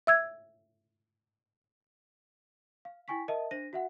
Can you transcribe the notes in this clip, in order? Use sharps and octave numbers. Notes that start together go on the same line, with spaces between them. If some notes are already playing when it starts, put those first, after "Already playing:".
E5 E6 G#6
F5
E4 G5 G#5 C#6 B6
A#4 D#5 E5 A5
D4 C5 A#6 D#7
F#4 E5 F#5